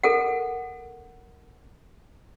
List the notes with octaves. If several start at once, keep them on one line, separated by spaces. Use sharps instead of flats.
A4 A#4 F#5